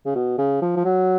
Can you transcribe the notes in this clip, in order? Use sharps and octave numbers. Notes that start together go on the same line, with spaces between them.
C#3
B2
C#3
F3
F3
F#3